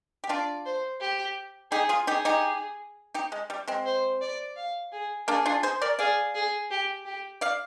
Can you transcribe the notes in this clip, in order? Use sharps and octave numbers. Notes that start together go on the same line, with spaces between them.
G4
D4 F4 D5
C5
G4
D#4 G4 G#4
F4 G#4
D#4 G4 G#4
D#4 G4
D#4 G4
G#3
G3
G#3 C4
C5
D5
F5
G#4
A#3 D4 G#4
D4 F4
G#4 C5
A#4 D5
G#4 D5 F5
G#4
G4
G4
D5 F5